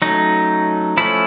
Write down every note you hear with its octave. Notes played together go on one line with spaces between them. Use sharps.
F#3 A3 C#4 D#4
F3 A3 C#4 E4